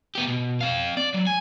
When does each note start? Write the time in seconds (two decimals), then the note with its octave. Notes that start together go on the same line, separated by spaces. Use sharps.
0.15 B3 G4
0.28 B2
0.61 C4 F5
0.97 D5
1.14 F#3 G3
1.27 G#5